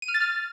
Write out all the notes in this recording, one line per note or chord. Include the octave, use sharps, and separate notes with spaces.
D#7
F6
A6
F6